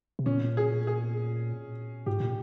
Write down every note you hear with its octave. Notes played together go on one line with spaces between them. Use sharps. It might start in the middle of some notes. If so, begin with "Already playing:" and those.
C3
A#2 C#4
G#4
G#4
G#2 G4
A#2